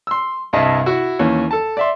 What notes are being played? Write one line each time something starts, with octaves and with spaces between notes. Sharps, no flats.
C6 E6
C2 G2 D#5 E5 A5
E4 F#4
D#2 E3 C#4
A4 A5
D5 E5 C6